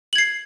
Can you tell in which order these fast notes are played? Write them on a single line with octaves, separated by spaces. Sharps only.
F#7 G#6 C7